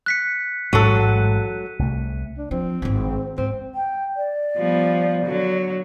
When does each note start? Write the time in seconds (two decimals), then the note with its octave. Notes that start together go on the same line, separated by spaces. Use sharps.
0.06 F#6 B6 C#7
0.73 A1 G#2 F#3 G#3 A4 D#7
1.79 C2 A3
2.38 D4
2.51 F3 C4
2.82 G#1 G2
3.38 G#2 C4
3.75 G5
4.16 D5
4.57 F3 G3 B3
5.25 D3 F#3